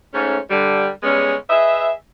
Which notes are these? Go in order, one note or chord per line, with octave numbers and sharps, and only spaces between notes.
G#2 A3 C#4
D3 G3
C#3 G3 G#3 B3 C#4
G#4 B4 D#5 E5